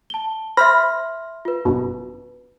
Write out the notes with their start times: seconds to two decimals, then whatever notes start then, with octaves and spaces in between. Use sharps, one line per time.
0.10 A5 G7
0.57 C5 E5 B5 C6 F6 A#6
1.45 F4 B4
1.65 G1 F#2 B2